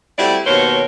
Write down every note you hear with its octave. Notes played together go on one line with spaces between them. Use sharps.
G3 A3 C4 E4 F#4 D5
D#2 B2 A#4 C5 C#5